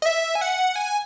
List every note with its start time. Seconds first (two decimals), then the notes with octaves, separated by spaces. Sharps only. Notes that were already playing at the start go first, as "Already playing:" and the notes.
0.02 D#5
0.06 E5
0.35 G#5
0.41 F#5
0.76 G#5